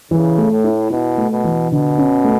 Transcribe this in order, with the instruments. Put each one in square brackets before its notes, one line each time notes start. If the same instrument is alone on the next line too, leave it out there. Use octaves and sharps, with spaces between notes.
[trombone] C#3 [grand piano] E3
[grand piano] A3
[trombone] A2
[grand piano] E4
[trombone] B2 [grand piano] E4
[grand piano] A3
[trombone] B2
[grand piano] E3
[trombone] B2 [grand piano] D3
[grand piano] C#4
A3